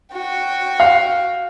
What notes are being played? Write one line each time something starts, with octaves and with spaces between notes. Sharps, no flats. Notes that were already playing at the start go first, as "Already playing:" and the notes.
F#4 G5
F5